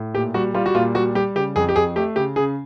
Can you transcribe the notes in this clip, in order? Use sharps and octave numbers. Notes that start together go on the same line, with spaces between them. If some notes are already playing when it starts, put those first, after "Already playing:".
Already playing: A2
A#2 G4
G3 F#4
G3 F4
F#4
A#2 F4
G3 F#4
G3 G4
C#3 G4
F2 G#4
G4
F2 G#4
A3 G4
C#3 G4
C#3 G#4